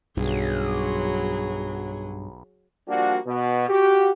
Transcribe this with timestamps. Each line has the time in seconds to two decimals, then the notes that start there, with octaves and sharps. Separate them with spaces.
0.17 B1 G2 F#3 G#4
2.88 F3 G3 A#3 D4 F#4
3.26 B2
3.68 F#4 G4